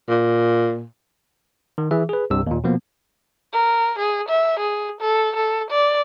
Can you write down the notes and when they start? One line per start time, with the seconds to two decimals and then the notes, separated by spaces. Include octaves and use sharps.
0.09 A#2
1.78 D#3
1.91 E3 G#4 E5
2.09 G#4 B4
2.30 C2 G2 C3 E6
2.47 D#2 A#2
2.64 B2 F3 A#3 B3
3.53 A#4
3.99 G#4
4.29 E5
4.60 G#4
5.01 A4
5.36 A4
5.71 D5